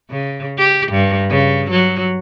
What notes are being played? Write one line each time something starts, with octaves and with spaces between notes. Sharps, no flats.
C#3
G4
G2
C#3
F#3